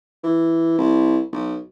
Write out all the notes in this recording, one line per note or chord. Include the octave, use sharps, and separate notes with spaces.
E3
C2
B1